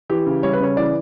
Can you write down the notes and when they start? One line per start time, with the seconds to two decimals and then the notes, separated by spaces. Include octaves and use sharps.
0.09 E3 G4
0.26 C#3
0.43 G3 C#5
0.53 B4
0.60 C#3 C#5
0.77 E3 D5